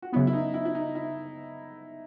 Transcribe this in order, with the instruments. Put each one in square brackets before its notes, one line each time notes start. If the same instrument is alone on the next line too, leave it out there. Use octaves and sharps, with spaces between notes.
[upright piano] F#4
[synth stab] F#2 C#3 F#3 B3 [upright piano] E4
[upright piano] E4
D#4
E4
E4
D#4
E4